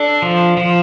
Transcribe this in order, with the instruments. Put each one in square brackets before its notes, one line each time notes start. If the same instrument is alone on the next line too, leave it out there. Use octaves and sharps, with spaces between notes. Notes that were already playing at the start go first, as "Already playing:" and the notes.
Already playing: [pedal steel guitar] D4 A4
F3
F3